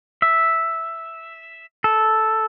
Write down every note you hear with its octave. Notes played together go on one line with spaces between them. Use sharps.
E5
A4